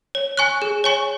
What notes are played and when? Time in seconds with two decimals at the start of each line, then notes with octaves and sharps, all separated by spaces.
0.15 C#5
0.37 G#5 C#6 F#6
0.62 G#4
0.84 C#5 G#5 C#6